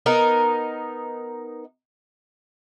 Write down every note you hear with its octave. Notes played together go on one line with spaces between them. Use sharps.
B3 D#4 A#4